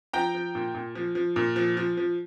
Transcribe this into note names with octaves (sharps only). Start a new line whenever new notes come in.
F3 G5 A#5
F3
A#2
A#2
F3
F3
A#2
F3
F3
F3